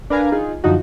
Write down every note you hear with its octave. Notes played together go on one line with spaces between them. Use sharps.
D4 A#4 B4 F5 G#5 A#5
D#4 F4 G#4
F#2 D3 F3 D#4 F#4